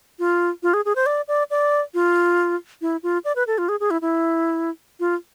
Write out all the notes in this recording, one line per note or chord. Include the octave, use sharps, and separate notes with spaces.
F4
F4
G#4
G#4
C5
D5
D5
D5
F4
E4
F4
D5
B4
A4
F4
G#4
G#4
E4
E4
F4